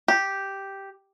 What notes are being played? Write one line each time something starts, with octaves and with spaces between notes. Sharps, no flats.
G4